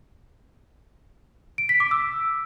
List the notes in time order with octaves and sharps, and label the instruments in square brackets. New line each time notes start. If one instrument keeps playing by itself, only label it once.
[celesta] D7
B6
D6
E6